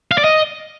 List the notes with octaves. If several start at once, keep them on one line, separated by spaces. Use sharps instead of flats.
F5
D5
D#5